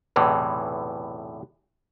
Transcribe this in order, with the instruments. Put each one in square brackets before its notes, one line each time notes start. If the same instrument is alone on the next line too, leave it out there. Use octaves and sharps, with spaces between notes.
[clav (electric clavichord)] B1 E2 A2 C3 E3